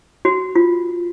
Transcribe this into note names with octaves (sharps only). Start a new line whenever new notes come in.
F#4
F4